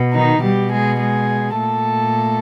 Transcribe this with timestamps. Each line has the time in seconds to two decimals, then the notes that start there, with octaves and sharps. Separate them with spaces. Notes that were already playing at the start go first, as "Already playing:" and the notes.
Already playing: B2
0.14 D#3 D#4
0.43 B2 G3 G4
0.72 G#3 G#4
1.01 G#3 G#4
1.59 A#2 A3 A4